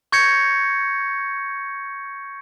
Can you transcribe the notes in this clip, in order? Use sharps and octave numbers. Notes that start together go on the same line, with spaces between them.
C#6 G6 G#6 A#6 C#7